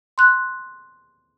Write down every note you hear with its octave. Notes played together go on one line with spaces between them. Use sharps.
C6 F#6